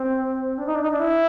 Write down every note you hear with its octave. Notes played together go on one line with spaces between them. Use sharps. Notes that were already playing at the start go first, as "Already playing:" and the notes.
Already playing: C4
D4
D#4
D4
D#4
D4
E4